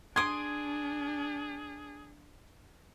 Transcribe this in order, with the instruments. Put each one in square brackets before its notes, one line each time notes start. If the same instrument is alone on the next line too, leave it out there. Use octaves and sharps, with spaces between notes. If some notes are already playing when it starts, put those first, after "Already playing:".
[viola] D4 [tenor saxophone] G#4 [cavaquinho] C6 D#6 [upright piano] G#6 D7